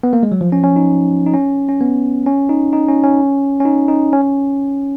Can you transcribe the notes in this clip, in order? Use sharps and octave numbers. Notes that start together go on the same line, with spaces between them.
B3
A#3
G#3
F#3
F3
C#4
C#4
D#4
D#4
C#4
C#4
B3
C#4
D#4
D#4
C#4
C#4
C#4
D#4
D#4
C#4